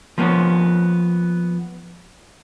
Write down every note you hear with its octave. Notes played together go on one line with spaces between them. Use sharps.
F3 A#3 B3 C#4